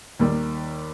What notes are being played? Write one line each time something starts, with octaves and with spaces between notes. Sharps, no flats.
D#2 D#3 G3